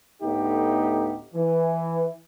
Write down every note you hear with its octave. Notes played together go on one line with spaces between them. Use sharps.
D2 A2 A3 B3 D#4 G4
E3